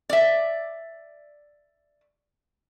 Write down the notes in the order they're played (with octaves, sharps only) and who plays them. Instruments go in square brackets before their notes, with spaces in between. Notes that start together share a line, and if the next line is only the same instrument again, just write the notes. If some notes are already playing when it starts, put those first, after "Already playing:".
[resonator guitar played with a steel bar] D5 E5